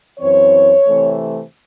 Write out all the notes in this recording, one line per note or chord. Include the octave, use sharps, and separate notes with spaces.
F#2 E3 C4 C#5
C3 E3 A3 C4